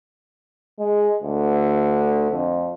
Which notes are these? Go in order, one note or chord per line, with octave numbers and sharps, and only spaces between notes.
G#3
D2
F2